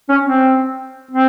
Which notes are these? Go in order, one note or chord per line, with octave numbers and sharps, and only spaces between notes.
C#4
C4
C4